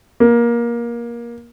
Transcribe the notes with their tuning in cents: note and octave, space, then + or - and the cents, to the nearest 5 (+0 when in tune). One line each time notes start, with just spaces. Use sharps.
A#3 +20